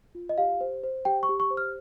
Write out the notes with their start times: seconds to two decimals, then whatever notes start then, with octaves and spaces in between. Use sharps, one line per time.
0.15 F4
0.29 D#5
0.38 G4 F5
0.61 C5
0.83 C5
1.05 G4 G5
1.23 C#6
1.29 G4
1.40 C#6
1.51 C5
1.57 F6